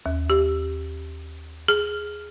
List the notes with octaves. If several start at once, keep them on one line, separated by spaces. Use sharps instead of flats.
D#2
G4
G#4